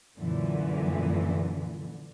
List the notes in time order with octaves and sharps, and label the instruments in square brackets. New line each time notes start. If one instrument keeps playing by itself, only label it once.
[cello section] F#2 A#2 D3 E3